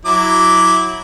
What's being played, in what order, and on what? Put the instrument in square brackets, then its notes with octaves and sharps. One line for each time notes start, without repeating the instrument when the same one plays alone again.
[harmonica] F#3 E4 D6